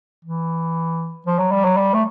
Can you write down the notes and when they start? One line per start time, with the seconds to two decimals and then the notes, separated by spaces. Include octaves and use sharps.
0.25 E3
1.26 F3
1.39 F#3
1.52 G3
1.64 F#3
1.77 G3
1.94 A3